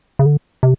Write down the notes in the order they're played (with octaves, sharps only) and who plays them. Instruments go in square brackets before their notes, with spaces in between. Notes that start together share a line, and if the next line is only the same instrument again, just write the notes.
[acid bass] C#3
D3
C3